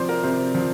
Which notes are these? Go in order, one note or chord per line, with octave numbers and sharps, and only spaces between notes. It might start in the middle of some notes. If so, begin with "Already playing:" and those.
Already playing: C3 F3 C5 D5
A#4
C3 C5
F3